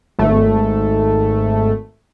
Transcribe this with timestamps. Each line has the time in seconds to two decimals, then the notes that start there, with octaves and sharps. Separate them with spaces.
0.19 G#1 A3